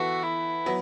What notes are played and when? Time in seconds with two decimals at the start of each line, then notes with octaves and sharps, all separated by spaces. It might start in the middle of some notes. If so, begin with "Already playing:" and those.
Already playing: E3 B3 F#4 A4 E5
0.23 E4
0.66 F#3 B3